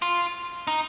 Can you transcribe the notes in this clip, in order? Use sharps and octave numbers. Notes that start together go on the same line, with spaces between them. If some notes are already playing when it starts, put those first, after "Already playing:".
F4
D#4